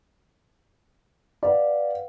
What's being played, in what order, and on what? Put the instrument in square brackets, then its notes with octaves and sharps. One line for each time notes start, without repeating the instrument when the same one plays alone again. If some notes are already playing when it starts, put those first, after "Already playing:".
[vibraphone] B4 F5 F#5 [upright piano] D5